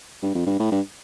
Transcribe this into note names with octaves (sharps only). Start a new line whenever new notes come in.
G2
F2
G2
A2
G2